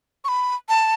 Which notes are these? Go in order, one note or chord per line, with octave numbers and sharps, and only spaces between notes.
C#6
B5
A5